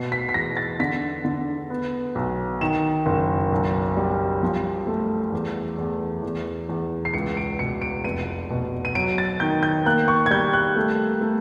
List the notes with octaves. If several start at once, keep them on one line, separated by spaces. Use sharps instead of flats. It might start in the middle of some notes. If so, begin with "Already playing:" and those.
Already playing: B2 C7
B6
B6
E2 A#6
A6
D3 B6
D3
B3
B1
D#3 E7
F#1
B1
G3
F3
A3
E2
E2
E2
E2
C7
C#2 C#7
D7
B2 C#7
D7
F1 D#7
B2
D#7
F#3 D7
A6
D#3 G6
G6
A#3 F#6
C#6
G#6
G3 G6
F#6
A3
A3